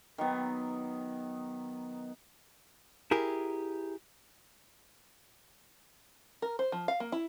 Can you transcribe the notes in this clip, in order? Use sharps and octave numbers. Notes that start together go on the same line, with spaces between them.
D#3 F#3 B3
E4 G4 G#4 A#4
A#4
C5
F3
F5
A#3
E4